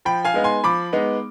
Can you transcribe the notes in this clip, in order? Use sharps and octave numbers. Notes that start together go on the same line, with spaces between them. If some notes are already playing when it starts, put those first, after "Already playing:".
F3 G5 B5
F5 G#5
G#3 B3 D#4
G#5 C6
F3 B5 D6
G#3 B3 D#4